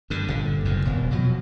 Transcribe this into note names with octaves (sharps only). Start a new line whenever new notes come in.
G2 D3
G1 A#2 D3
F#1 F2 A2
D#1 B2
B2 F3 F#3